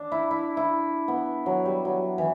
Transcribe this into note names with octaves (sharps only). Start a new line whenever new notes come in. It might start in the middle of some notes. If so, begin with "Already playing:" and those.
Already playing: D4
E4
E4
E4
B3
F#3
G3
F#3
E3